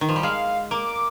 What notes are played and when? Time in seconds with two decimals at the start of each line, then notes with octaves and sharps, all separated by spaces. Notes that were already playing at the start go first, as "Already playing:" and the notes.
0.01 D#3
0.09 F3
0.16 G3
0.23 G#3 F5
0.71 A#3 D6